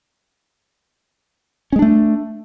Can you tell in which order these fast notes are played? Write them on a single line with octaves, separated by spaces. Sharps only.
C#4 G#3 D4 A3